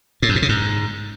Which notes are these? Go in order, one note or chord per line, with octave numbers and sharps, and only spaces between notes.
A2
F#2
B2
C#3
G#2